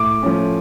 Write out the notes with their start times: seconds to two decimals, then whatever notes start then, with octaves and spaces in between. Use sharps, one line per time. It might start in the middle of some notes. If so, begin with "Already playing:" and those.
Already playing: A2 D6
0.23 F3 A3 C#4